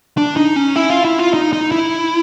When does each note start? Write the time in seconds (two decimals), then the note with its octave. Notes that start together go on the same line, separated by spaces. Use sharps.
0.17 D4
0.37 D#4
0.56 C#4
0.76 E4
0.90 F4
1.05 E4
1.19 F4
1.34 D#4
1.53 D#4
1.72 E4